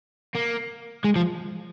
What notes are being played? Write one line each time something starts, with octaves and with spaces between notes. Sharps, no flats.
A#3
G#3
F3